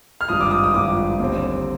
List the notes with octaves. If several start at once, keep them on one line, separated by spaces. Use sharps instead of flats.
F6
G#1 G2 F3 D#6
D6
D#6
D#6
G#1 G2 F3 D6
D#2 D3 G3 C4